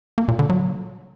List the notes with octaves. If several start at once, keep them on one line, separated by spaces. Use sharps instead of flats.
A#3
A#2
D3
F#3